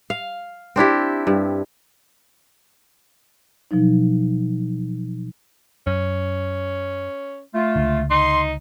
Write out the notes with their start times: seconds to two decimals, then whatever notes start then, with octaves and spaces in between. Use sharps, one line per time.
0.10 F5
0.76 C4 D4 E4 G4
1.27 G2
3.71 B2 F3 F#3 D#4
5.87 F#2 C#4
7.54 A3 F4
7.76 C#2 D3
8.10 D#4 C6